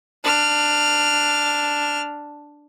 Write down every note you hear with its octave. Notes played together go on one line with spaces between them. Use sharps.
D4 F6